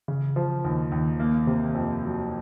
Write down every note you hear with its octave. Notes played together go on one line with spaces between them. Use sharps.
C#3
F3
D#2
D#2
A#3
C3
F2
F#3